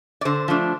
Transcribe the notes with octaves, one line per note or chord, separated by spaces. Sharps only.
D5
D3 C5
F3 A3 D4